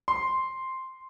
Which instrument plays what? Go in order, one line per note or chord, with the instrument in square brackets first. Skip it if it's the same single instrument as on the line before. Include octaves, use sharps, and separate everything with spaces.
[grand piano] C6